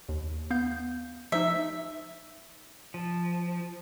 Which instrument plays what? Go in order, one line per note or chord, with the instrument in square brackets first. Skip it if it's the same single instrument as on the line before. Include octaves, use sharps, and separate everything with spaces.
[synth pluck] D#2
B3 F5 G6
[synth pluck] F3 D#4 [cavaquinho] E5
[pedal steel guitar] F3